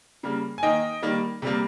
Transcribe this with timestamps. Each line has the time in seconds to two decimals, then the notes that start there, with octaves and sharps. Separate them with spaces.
0.23 C#3 G3 A#3
0.58 G#5
0.63 D#3 A#3 D#5 G5
1.02 D#3 G3 A#3
1.42 C3 G3 A#3